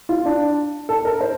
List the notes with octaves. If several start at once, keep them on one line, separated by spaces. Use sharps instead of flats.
F4
D4
A4
A#4
C5